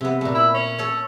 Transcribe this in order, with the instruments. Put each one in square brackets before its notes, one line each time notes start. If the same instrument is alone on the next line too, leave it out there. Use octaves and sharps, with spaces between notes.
[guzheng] C3 B3
A#2 A3
[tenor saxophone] E4
C#4
[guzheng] A4 C#5